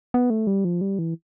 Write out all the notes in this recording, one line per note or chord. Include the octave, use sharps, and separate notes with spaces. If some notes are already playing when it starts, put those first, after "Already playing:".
B3
A3
G3
F3
G3
E3